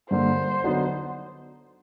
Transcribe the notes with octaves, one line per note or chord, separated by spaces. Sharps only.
G2 D3 G3 A#3 C5
D3 F#3 B3 D#4